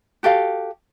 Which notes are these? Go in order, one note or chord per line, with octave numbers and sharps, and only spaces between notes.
F#4 G4 A4 F5